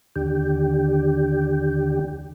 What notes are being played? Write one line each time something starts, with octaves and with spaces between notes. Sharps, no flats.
D#2 D3 G4